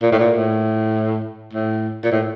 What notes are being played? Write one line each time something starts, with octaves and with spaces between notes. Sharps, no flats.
A#2
A2
A#2
A2
A2
A#2
A2